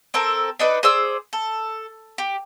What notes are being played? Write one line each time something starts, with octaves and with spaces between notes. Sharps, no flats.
C4 A4 A#4
D4 D#4 B4
G#4 C5 D5 E6
A4
G4